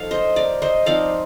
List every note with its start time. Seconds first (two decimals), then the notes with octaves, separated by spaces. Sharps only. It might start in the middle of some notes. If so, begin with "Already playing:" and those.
Already playing: F3 D#4 A4 F5
0.11 C5 D#5
0.36 A#4 D5
0.62 C5 D#5
0.86 F3 C4 D#4 D5 F5